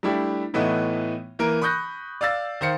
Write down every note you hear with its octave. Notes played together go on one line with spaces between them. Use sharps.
G3 A3 D4 E4 G4
A2 E3 A3 B3 D#4 E4
E3 A#3 A#4
B5 C#6 D#6 F#6 G6 A#6
D5 F5 E6 A6
D#3 C5 F5 C#7